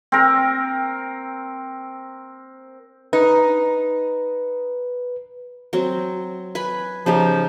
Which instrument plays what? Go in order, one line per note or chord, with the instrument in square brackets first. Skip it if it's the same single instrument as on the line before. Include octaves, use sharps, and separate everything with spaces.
[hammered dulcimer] C4 A#4
[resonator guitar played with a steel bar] D#4 [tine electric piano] B4
[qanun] F#3 C4
B4 G#5 B5
[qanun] C#3 D#4 G4 [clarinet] F3